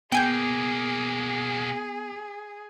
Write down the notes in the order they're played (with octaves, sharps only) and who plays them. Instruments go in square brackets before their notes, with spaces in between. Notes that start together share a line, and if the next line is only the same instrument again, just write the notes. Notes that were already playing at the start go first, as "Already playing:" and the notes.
[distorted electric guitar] B2 A#3 [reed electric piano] B3 [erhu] G#4 [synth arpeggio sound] G5 G#5 G6